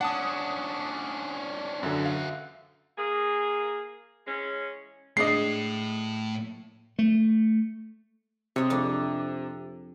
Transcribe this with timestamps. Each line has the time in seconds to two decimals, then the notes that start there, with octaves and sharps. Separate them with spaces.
0.01 C#4 D4 F#5 A5 D#6
1.83 F#2 D3 F#4 E5
2.06 F5
2.97 A#3 G#4
4.27 E3 G#3 C#4
5.17 A2 G#3 D4 D#5 C7
6.99 A3
8.56 C3 G#3 C#5
8.70 F2 D4